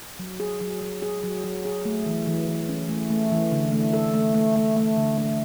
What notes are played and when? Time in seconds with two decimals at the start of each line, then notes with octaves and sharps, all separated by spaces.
0.19 F#3
0.40 G#4
0.61 F#3
0.81 F#3
1.02 G#4
1.23 F#3
1.44 F#3
1.65 G#4
1.85 A3
2.06 E3
2.27 E3
2.48 E3
2.69 C#4
2.89 A3
3.10 A3
3.31 E3
3.52 D3
3.73 A3
3.93 A4
4.14 A3
4.34 A3
4.56 A3
4.77 A3
4.97 D3
5.18 A3